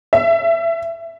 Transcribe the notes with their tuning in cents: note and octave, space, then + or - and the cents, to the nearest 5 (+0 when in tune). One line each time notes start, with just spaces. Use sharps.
E5 +20